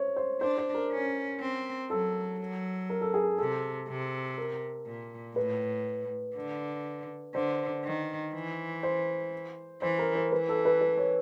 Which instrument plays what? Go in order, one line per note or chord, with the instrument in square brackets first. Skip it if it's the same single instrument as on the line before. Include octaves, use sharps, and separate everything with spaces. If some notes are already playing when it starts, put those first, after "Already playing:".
Already playing: [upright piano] C5 C#5
C5
[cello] D4 [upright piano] C5
[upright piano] C5
A#4
[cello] C#4
C4
[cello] F#3 [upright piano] A4
[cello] F#3
[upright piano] A#4
A4
G#4
[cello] C3 [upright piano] A4
[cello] C3
[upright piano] A#4
[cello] A#2
[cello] A2 [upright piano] B4
[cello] D3
[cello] D3 [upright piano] C5
[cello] D#3
E3
[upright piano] C5
[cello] E3 [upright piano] C5
[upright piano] A#4
C5
[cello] E3 [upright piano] B4
[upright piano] A4
B4
B4
C#5